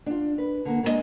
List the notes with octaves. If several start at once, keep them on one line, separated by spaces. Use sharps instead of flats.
D4 F4
B4
D3 A#3
G#3 A#3 D4 E4 D#5